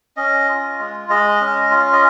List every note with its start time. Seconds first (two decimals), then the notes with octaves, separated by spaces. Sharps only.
0.17 C#4 D#5
0.49 F4
0.79 G#3
1.09 G#3 D#5
1.41 C#4
1.71 F4
1.92 D#5